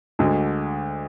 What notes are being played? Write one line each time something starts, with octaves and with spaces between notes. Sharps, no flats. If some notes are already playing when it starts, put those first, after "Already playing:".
D2 D3 G#3